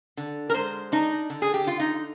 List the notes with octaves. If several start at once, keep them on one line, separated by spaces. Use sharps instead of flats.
D3
A#4
G#3 C5
D4 D#4
D3
G#4
G4
D3 F4
D#4